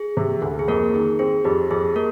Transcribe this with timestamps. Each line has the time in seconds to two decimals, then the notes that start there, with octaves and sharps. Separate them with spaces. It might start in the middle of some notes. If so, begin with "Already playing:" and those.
Already playing: G#4
0.17 C3
0.42 D2
0.59 G#4
0.68 F2 A#3 A#4
0.94 D#3 G#4
1.19 C4 G#4
1.44 F2 G4
1.71 F2 G#4
1.96 A#3 A#4